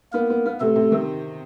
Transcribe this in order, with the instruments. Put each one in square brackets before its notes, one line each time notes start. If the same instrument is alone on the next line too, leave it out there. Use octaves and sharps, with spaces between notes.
[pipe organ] A#3 A#4 [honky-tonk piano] B3
[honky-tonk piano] B3
B3
[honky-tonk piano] C3 [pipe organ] A3 A4
[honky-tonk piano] C3
D#3